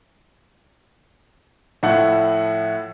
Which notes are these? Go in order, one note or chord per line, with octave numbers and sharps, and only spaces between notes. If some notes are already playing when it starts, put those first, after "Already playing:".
A2 F3 A3 E4 F#5